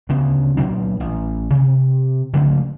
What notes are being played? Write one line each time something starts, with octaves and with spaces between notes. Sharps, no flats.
D2 C#3 B3
D2 A#2 F#3 D4
A1
C3
C#3 F3 G#3 A3